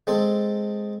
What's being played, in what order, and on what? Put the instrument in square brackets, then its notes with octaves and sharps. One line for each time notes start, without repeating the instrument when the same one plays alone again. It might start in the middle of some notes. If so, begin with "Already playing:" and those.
[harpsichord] G#3 C4 A4